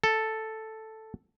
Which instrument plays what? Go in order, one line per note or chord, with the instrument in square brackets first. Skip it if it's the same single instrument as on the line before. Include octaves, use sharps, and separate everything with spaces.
[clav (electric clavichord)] A4